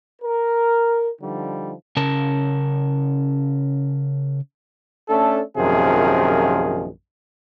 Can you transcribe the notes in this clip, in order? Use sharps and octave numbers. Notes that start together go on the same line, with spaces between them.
A#4
D3 F3 G3 D#4
C#3 C#4 A#4 A5
A3 C#4 D4 A4
A#1 F#2 C3 D#3 F3 G#4